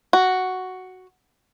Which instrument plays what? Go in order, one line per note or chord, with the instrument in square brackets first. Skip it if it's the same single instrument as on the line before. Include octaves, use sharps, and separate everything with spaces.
[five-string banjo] F#4